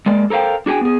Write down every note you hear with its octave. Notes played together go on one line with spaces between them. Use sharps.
G#3 A#3 D5
A4 A#4 C5 F5 G5
D4 F#4 G#4 G5 G#5
B3 G#4